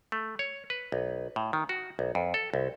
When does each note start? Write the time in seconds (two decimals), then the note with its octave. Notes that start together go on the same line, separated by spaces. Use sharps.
0.12 A3
0.39 C#5
0.70 B4
0.92 B1
1.36 A2
1.53 D#3
1.69 F#4
1.99 B1
2.15 F2
2.34 A4
2.54 C2